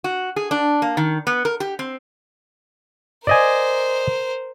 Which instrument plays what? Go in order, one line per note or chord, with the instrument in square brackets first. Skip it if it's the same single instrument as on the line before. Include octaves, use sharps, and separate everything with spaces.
[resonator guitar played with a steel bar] F#4
G#4
D4
A#3
D#3
B3
A#4
G4
C4
[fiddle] A#4 C5 [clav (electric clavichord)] D5 D#5 G#5